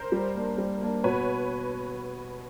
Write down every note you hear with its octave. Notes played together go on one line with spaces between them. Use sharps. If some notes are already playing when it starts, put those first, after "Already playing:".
Already playing: A#4 C5
G3
A#3 D4
G3
A#3 D4
B2 B4 C#5